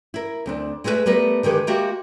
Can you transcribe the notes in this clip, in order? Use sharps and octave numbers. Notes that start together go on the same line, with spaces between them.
E4 A#4
D2 C4 D4
G#3 A3 B3 G#4 B4 E5
G3 A3 B3 A#4 B4
D3 D#3 G#3 G4 B4
G#3 A#3 F#4 G4 E5 G5